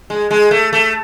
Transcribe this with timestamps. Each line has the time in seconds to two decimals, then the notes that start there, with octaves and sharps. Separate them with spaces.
0.10 G#3
0.31 G#3
0.51 A3
0.73 A3